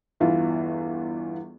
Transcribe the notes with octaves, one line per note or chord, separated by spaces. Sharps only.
G1 E2 E3 F4